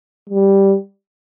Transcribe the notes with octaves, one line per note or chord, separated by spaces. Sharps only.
G3